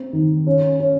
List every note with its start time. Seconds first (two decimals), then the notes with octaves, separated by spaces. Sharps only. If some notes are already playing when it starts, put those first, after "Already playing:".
Already playing: C4
0.13 D#3
0.47 C#4
0.80 C#4